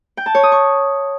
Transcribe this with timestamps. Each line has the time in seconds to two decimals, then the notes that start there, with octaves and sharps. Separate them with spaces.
0.17 G5
0.26 A5
0.35 C#5
0.43 D#6
0.52 C#6